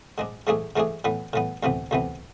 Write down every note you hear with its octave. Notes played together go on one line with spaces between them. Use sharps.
G#2 G#3 D4
G#2 E3 A3 D4 G#4
G#2 E3 A3 D4 G#4
A2 E3 B3
A2 E3 B3
D2 C3 E3 B3
D2 C3 E3 B3